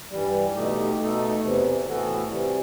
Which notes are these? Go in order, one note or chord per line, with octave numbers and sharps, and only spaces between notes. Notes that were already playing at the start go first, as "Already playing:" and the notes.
G2 E3 G3
B2 A3 D#4 G4
B2 A3 D#4 A4
E2 C3 E3
A2 E3 B3 F#4 A4
C3 E3 G3